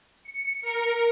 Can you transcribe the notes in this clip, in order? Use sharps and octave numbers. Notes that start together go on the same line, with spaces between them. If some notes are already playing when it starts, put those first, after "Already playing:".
C#7
A#4